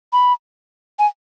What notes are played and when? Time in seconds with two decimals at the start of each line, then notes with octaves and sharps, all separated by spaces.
0.13 B5
0.99 G#5